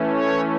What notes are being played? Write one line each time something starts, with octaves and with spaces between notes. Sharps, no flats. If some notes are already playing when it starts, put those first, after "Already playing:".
Already playing: E3 A3 C#4
C#5